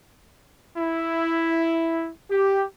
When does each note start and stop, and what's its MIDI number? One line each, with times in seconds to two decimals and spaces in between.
0.78 2.10 64
2.31 2.65 67